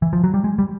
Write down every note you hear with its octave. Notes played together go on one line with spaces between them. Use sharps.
E3
F3
F#3
G3
G#3
G3